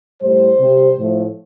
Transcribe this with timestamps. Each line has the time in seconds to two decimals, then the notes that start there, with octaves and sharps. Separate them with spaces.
0.22 A2 G3 C5
0.59 C3 G3
0.96 A2 F3 A3